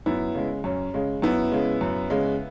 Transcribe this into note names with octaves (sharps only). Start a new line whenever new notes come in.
F#2 B3 E4
C#3 G#3
F#2 C#4
C#3 G#3
F#2 B3 E4
C#3 G#3
F#2
C#3 G#3